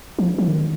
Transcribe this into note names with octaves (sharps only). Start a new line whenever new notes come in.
F3
F3
D#3